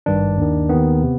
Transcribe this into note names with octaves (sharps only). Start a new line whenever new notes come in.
G#1 G2 D#3 D4
D#2 D#3
D#2 D#3 B3
C3